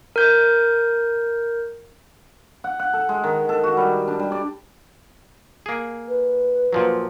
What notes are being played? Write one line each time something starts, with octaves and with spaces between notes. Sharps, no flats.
A#4 G6
F#5
F#5
A4
G#3
D#3
A4
F#4
G3
D4
G3
D5
A#3 G#4
B4
A#2 F3 F#3